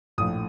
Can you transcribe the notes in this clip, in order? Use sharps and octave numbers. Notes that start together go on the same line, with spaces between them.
A#1 A2 D#6